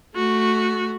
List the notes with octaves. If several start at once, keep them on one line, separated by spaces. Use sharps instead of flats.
A3 F#4